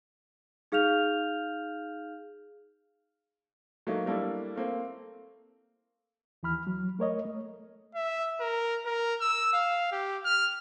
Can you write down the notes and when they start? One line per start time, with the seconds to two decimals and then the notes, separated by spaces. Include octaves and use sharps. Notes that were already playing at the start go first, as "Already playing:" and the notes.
0.72 D#4 G#4 F5 F6 G6 F7
3.87 F#3 A3 A#3 D#4
4.06 G3 A3 A#3 D4 E4 A4
4.56 A3 A#3 C4
6.43 D#2 E3 B5 F6
6.67 F#3
6.99 A3 A#4 C#5 D#5
7.25 A3
7.95 E5
8.41 A#4
8.86 A#4
9.21 E6
9.53 F5
9.92 G4
10.25 F6